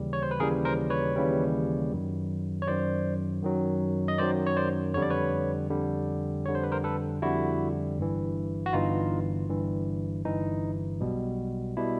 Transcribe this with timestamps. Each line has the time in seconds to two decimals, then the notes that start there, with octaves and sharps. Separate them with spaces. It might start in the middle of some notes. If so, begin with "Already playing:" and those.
Already playing: D#2 C#3 E3 G3
0.13 C#5
0.23 C5
0.31 B4
0.40 D#2 C#3 E3 G3 G#4 A#4
0.65 A#4 C5
0.90 B4 C#5
1.16 D#2 C#3 E3 G3
1.91 F#2 D#3 F#3
2.62 C#5
2.67 F#2 D#3 F#3 C5 D5
3.43 F#2 D#3 F#3
4.08 D#5
4.18 F#2 D#3 F#3 C5 D5
4.47 C#5
4.57 C5 D5
4.94 F2 D3 G3 C#5
5.02 D5
5.10 B4 C#5
5.70 F2 D3 G3
6.46 F2 D3 G3 C#5
6.55 C5
6.63 B4
6.72 A#4 C5
6.84 A4 B4
7.22 F2 D3 G3 E4 F#4
7.98 G1 G2 E3
8.66 F#4
8.73 G1 G2 E3 D#4 F4
9.49 G1 G2 E3
10.25 G1 G2 E3 D#4
11.01 B1 B2 G3
11.77 B2 G3 E4